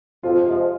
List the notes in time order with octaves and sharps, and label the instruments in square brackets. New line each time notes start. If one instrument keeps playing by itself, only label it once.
[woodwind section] F2 [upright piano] F4
[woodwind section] C3 F3 G#3